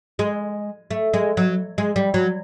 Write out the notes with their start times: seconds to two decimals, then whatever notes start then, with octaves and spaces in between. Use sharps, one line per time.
0.19 G#3
0.91 A3
1.14 G#3
1.37 F#3
1.78 G#3
1.96 G3
2.14 F#3